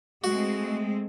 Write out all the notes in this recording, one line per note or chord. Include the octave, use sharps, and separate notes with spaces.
G#3 A3 C4 F#4